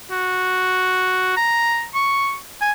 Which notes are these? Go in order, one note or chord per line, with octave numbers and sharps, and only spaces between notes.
F#4
A#5
C#6
G#5